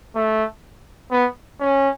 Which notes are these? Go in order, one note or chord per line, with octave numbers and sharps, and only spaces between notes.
A3
B3
C#4